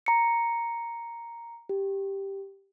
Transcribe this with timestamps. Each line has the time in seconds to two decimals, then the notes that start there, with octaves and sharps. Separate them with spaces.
0.06 A#5 C#7
1.69 G4